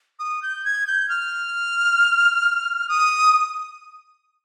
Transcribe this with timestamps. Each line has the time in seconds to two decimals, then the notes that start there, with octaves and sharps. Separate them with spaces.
0.19 D#6
0.42 G6
0.65 G#6
0.87 G6
1.09 F6
2.89 D#6